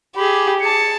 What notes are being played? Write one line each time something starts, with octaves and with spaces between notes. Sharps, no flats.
G4 G#4 B5
G#4 A5 C#7